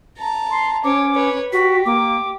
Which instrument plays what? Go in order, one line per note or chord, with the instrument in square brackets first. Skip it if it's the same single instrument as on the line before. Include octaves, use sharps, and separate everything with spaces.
[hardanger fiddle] A5 A#5
[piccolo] C6
[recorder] C#4 [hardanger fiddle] C5 C#5 [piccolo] D6
[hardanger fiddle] B4 C#5
[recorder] F#4 [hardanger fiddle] G4 [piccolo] B6
[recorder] A#3 [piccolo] D6